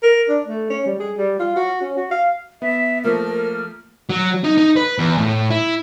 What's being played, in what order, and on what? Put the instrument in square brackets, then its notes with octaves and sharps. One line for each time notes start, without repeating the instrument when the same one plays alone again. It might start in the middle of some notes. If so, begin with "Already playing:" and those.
[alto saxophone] A#4
D4
A3
C#4
G3
G#4
G3
F4
F#4
C#4
F#4
F5
[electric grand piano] B3 [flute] E5
[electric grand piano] F3 A3 A#3 [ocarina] A#4 [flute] F6
[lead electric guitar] F#3
D#4
D#4
B4
E2
A2
E4